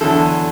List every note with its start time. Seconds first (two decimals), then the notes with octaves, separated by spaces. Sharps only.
0.01 E2 D3 F#3 A4